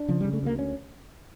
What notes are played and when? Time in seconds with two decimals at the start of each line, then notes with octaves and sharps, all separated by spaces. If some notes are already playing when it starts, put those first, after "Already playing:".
Already playing: D4
0.08 C#3 F3
0.21 C#3 G3
0.33 A3
0.43 D2 A#3
0.59 C#4